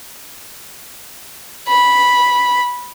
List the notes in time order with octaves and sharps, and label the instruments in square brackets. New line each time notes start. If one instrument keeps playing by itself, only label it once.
[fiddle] B5